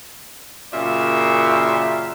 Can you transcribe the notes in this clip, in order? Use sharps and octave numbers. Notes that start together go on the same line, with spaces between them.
F#2 A#2 C#3 F4 D5 E5